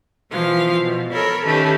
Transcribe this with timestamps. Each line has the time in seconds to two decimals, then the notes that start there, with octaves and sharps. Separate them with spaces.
0.31 B2 E3 F3 F5
0.81 B2
1.11 A4 A#4 C#5 B5
1.44 D#3 A3 C#4 G4 B4